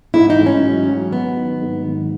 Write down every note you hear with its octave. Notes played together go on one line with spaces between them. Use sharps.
G#2 E4
D#4
A1
C#4
F#3
F#3
F#3 B3
D#3
G#2
G#1